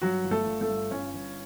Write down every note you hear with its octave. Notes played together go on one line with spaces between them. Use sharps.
G2 F#3 F#4
G1
A3 A4
G1
A3 A4
G2
G1 C#4 C#5
G1